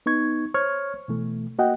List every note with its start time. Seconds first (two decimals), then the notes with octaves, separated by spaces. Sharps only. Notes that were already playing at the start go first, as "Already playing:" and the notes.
0.06 B3 D#4 C#6 G#6
0.54 C5 C#5 C#6 F6 G#6
1.08 B2 E3 A3
1.58 A#3 F#4 D#5 F#5 G5